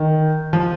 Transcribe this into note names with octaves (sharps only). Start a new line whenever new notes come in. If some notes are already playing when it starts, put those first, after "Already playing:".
Already playing: D#3
F3